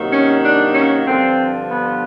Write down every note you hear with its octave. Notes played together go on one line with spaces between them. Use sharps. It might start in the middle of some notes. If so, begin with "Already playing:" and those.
Already playing: C3 D#3 F#3 A#3
C#4
D4
C#4
G2 D3 F3 C4
B3